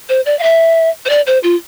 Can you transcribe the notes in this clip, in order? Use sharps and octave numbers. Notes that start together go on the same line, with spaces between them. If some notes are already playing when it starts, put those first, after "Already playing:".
C5
D5
F5
E5
C5
D5
C5
F4